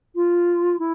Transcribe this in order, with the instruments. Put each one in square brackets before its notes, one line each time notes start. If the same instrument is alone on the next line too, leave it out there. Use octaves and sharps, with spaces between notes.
[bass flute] F4
E4